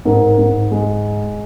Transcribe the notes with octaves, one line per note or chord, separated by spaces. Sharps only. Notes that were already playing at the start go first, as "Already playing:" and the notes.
G#2 A#4
G#2
G#3